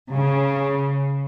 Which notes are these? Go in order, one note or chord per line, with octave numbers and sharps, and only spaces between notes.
C#3